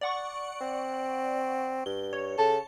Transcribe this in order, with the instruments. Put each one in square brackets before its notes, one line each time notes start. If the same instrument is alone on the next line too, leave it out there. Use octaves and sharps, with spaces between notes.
[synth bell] D5 F#5 C#6
[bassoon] C4
[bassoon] G2 [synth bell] G7
[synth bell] C#5
[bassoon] C#3 [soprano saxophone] A4 [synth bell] A5